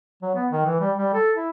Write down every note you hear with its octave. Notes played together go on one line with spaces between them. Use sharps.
F#3
B3
D#3
E3
G3
G3
A4
E4